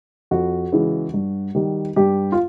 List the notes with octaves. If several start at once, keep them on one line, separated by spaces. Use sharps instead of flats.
F2 F#4
C#3 E3 G#3
G2
D#3 G3
G2 G4
F4